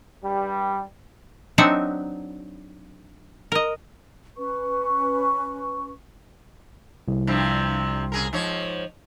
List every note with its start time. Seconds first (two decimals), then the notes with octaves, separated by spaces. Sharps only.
0.24 G2 G3
1.58 F#3 C4 D4 D#4 E5 F#5
3.52 A#4 D#5
4.37 C#4 B4 C#6
7.08 C2
7.27 G2 C3 F3
8.12 C#3 G#4 A#4
8.33 G#2 F3 C#5